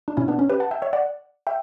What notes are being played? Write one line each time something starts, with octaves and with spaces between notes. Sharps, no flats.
D4
B2 C#4 E4
B3 D4
C#4
G4 B4
F#5 A5
E5 G5
C#5 E5
D5 F#5
E5 G5